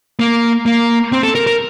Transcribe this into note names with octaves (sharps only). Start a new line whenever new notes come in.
A#3
A#3
C4
A4
A#4
A#4